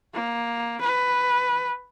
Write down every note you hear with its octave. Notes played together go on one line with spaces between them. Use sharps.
A#3
B4